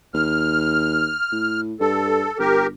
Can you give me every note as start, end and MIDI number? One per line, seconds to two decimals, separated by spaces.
0.14 1.13 39
0.14 1.61 89
1.32 1.74 45
1.80 2.26 43
1.80 2.38 69
2.39 2.74 31
2.39 2.67 67
2.39 2.67 70